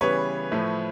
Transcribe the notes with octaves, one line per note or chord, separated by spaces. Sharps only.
C#3 E3 G3 B3 B4 C#5
A2 F3 A3